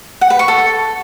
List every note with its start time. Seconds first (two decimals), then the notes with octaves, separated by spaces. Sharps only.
0.21 F#5
0.30 B4
0.39 C#6
0.48 A4